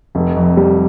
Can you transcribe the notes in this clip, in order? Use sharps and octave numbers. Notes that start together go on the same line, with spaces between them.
F1
F2
G3